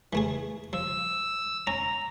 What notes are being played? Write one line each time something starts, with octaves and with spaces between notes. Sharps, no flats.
E3 A3 G#4
F3 E6
C#4 A#5